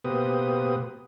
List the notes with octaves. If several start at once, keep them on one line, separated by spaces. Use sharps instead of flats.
B2 A#3 G4 B4 C5 D#6